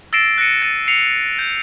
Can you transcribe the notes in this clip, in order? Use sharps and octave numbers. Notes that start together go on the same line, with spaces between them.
E6 A6 A#6 C7 D7 E7
F#6 A#6 C#7 D#7
A6 D#7
C7 C#7 F7
G6